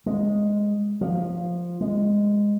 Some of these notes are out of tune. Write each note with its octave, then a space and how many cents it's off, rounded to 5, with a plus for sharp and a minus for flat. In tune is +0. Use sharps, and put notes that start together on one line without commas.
G#3 -5
F3 +5
G#3 -15